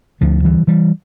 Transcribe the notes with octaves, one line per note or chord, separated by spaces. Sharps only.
D2 D3 F3 A3
E3 G3
E3 G3